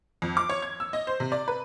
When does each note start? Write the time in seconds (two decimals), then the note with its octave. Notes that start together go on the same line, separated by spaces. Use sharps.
0.22 F2
0.37 D6
0.49 C#5
0.62 G#6
0.80 E6
0.93 D#5
1.07 C5
1.20 C3
1.32 D5
1.48 B4